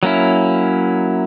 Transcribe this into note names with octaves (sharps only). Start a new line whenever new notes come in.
F#3 A#3 C#4 E4